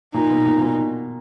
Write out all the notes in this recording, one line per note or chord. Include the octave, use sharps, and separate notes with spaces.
A#2 D#4
B2
A#2
A#2
B2